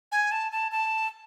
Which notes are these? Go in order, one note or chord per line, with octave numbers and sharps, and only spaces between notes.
G#5
A5
A5
A5